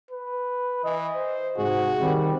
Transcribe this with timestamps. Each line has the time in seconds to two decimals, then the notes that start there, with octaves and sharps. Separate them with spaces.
0.11 B4
0.84 E3 D#5
1.15 C5
1.57 G#2 C3 F#4 G#4
2.00 D#3 G3 C4